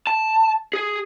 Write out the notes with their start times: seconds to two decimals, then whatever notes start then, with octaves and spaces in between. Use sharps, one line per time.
0.07 A5
0.73 G#4